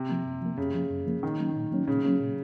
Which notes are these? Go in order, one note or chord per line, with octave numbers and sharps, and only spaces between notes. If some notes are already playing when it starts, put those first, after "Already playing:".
Already playing: C3
F3 A#3
F#2
F3 A#3
F#2 C#3
F3 A#3
F#2
F3 A#3
A#2 D#3
F#3 A#3 C#4
A#2
F#3 A#3 C#4
A#2 C#3
F#3 A#3 C#4
A#2